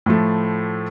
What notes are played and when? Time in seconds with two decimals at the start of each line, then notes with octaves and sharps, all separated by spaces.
0.06 A2 F3 A3